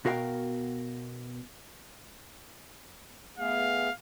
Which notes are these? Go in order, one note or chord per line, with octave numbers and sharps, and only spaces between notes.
B2 F#4 A#4 F5 G5
A3 B3 G#4 F5